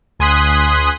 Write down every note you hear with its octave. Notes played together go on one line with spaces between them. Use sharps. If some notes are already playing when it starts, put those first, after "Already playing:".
D2 G#5 C6 D#6 F#6 B6